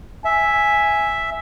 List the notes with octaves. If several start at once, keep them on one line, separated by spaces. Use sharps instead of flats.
E5 G#5